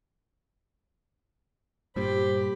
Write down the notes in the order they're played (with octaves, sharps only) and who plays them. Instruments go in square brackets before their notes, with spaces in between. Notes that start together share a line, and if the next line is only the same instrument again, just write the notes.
[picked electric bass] G2 A#2 [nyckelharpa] G4 B5 [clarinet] C5